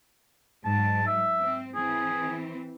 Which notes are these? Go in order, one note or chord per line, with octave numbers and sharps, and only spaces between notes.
G#2 F#3 A5
E5
C4
E3 C4 G#4